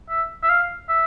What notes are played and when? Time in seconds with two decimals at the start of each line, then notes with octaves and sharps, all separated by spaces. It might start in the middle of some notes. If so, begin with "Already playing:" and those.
0.09 E5
0.43 E5
0.50 F5
0.89 E5